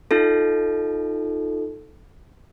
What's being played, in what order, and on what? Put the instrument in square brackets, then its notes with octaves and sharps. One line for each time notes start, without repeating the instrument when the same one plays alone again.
[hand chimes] D#4 F4 A4